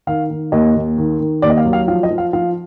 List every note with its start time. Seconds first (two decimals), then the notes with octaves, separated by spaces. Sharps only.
0.07 D#3 F5
0.30 D#3
0.52 D#2 D#5
0.75 D#2
0.98 D#3
1.20 D#3
1.42 D#2 D5
1.50 D#5
1.57 F5
1.65 F#3
1.73 F5
1.88 F3 F5
2.03 D#5
2.10 F3
2.18 F5
2.33 F3 F5